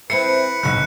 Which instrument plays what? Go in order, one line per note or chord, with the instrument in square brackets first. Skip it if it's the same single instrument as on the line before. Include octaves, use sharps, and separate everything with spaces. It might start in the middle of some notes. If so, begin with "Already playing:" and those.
[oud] C4 E4 A4 [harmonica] B4 [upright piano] C7 [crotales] C#7
[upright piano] F#1 B1 [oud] G#2 F#3 [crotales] F#6